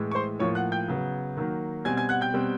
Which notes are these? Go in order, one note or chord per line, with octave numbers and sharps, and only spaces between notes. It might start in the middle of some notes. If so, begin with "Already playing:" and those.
Already playing: A2 E3 G#3
C#6
C5 C6
A2 F3 A#3 C#5 C#6
F#5 F#6
G5 G6
C#3 F#3 B3
D#3 F#3 A#3
B2 G3 C4 G#5 G#6
G#5 G#6
F#5 F#6
G5 G6
B2 G3 C4